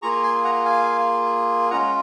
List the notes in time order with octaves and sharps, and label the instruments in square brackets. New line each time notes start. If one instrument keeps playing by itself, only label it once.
[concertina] A#3 F4 G#4 A#5 C#6
G#5 C6
F#5 A#5
F5 G#5
G#3 C#4 F4 F#5 A#5